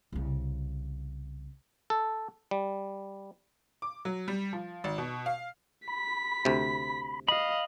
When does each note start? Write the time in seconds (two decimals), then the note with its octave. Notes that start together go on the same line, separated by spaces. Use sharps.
0.12 C2 C#3
1.90 A4
2.51 G3
3.82 D6
4.05 F#3
4.28 G3
4.53 F3
4.84 G#1
4.98 B2
5.26 F5
5.88 B5 B6
6.45 D2 C3
7.28 D#5 F5 B5